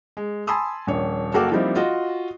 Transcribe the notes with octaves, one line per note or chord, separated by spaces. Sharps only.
G#3
G#5 A5 B5 C6 D#6 E6
D#1 A#1 C#5
F#1 A#3 F#4 A4 G5 D6
F3 G3 A#3 C4 D#4 E4
F4 F#4 D#5